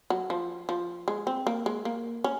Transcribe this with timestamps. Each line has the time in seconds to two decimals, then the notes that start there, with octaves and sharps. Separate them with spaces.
0.10 F#3
0.30 F3
0.69 F3
1.08 G#3
1.27 C4
1.47 A#3
1.66 G#3
1.85 A#3
2.24 C#4